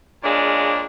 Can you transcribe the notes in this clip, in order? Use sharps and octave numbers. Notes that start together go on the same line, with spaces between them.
A#2 C#3 G#3 D4